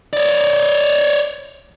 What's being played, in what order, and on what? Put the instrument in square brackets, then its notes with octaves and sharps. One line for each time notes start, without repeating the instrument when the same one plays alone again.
[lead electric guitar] C#5 D5